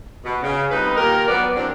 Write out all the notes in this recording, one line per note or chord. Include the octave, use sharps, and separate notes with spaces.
B2
C#3
F2 G3 B3 D#4 B4
D#2 A#2 G4 A#4
F#3 B3 D5
E2 F#3 C4 D4 A#4 D5